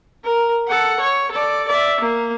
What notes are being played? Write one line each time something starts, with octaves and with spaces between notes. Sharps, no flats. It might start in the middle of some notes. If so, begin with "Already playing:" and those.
A#4
A4 F#5
C#5
A4 D5
D5 E5
A#3